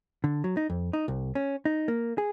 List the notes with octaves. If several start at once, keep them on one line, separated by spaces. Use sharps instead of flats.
D3
F#3
D#4
F2
D#4
C2
C#4
D#4
A#3
G#4